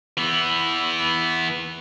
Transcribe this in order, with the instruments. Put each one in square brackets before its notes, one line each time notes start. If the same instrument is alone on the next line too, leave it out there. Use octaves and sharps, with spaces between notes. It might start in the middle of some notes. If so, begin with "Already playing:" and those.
[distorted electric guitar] E3 B3